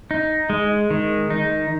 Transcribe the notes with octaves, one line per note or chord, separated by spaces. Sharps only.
D#4
G#3
D#3
D#4